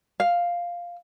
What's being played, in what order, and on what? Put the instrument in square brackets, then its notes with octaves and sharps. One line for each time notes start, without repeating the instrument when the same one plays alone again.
[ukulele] F5